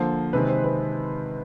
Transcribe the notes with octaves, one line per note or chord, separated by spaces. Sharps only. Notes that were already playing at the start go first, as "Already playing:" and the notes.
Already playing: D3 F3 A#3 C5
C3 D#3 G#3 C4 B4
C5
B4